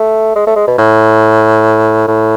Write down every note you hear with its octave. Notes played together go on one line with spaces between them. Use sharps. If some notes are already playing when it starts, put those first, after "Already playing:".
Already playing: A3
G#3
A3
G#3
B2
A2
A2